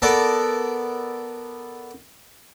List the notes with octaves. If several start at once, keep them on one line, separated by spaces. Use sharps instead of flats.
B3 A4 A#4 D5